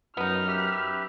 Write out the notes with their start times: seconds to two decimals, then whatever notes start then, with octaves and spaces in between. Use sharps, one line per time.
0.17 F#2 B3 D#4 F6
0.47 G4 B4 E5